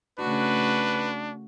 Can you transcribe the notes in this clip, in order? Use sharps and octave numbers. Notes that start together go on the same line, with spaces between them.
C#3 A3 D4 F#4 B4